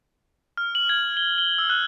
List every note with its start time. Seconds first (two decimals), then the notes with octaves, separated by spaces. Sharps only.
0.57 F6
0.75 F#7
0.89 G#6
1.17 G7
1.38 G7
1.58 E6
1.70 F#6